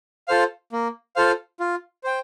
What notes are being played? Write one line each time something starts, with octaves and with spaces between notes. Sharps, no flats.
F4 A4 C5 F5
A#3
F4 A4 C5 F5
F4
C5 G5